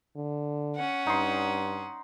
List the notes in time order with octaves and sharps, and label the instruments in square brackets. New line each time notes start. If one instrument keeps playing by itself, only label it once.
[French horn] D3
[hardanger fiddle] C#4 F#5
[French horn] G2 [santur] D#4 C6